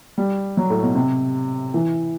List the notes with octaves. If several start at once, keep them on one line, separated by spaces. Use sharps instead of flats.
G3
F#3
A2
B2
C3
E3